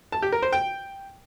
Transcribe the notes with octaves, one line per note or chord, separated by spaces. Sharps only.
A5
G4
A#4
C5
G5